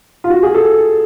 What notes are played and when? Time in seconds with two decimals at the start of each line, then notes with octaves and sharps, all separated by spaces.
0.24 F4
0.30 F#4
0.43 G#4
0.54 A4